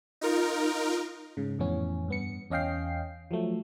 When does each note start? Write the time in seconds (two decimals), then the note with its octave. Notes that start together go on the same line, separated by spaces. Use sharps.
0.21 D#4 F4 A#4
1.37 G#2 C#3
1.59 F2 A2 E3 B3 C#4
2.08 G2 B3 C#7
2.50 E2 C#4 D#5 F5 G5 C7
3.31 F3 F#3 A3